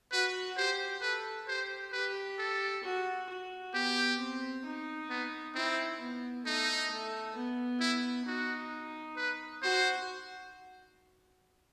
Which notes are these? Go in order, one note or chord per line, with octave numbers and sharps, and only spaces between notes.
F#4 B4
G4 C5
A4 B4
G4 C5
G4 B4
A4
F#4
F#4
B3 G4
C4
D#4
B3
C4 E4
B3
A3 D#4
A3
B3
E4
D#4 F#4
B4
F#4 C5